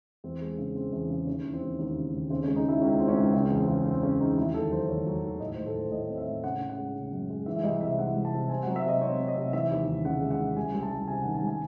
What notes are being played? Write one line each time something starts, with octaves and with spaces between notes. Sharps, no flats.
E2 C4
G#3
C#3
C4
E2
C#3
D#2 C#4
E3
C4
D#2
D#2
C#3
D#2
C#3 C4
C#4
G#3
D#4
G#3 E4
C#2 C#4
C#2 C4
C#4
C#2
C#3 C4
E2
C4
C#3
E2 C4
C#3 C#4
E2 D#4
D#2 E4
D#2 A4
F#3 C5
D#3 C#5
F#3
D#2
A2 D#5
C5
A2
A4
A2 C5
A2 D#5
C4
E5
A2
C#3 F#5
C#3
F#5
G#3
C#3
F#2
G#3
E3 E5
E5
C2 D#5
C3 E5
E3 F#5
C2
A5
C3
C4 G#5
F#5
F#3
E5
C3 D#5
C4 C#5
C4
D#5
C3
E3 E5
D#2
D#2
C#3 F#5
G#3
F#5
C#3
C2 G#5
C2
A5
C2
C3 G#5
F#5
D#3
G#5
C2
G#5